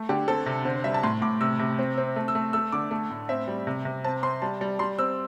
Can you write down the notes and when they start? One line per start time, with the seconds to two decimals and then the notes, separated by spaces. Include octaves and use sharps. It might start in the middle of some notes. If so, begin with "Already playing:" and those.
Already playing: A3
0.09 D3 G4
0.28 C4 A4
0.46 C3
0.65 D3 C5
0.75 C5
0.84 G3 E5
0.94 A5
1.03 A2 C6
1.22 A2 D6
1.41 C3 E6
1.59 C3
1.79 C4
1.98 C4
2.16 A3
2.28 E6
2.35 A3
2.53 A3 E6
2.72 D3 D6
2.91 A3
3.10 A2
3.29 C4 E5
3.48 G3
3.67 C3
3.85 C3
4.04 C4 A5
4.23 C4 C6
4.42 G3 A5
4.61 G3
4.79 G3 C6
4.99 C4 E6